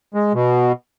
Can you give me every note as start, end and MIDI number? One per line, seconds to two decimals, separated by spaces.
0.14 0.33 56
0.34 0.72 47